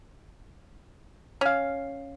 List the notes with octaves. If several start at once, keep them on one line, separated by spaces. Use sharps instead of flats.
C#4 F5